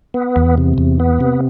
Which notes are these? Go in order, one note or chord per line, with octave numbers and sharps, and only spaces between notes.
B3
E2
C3
E2
B3
C3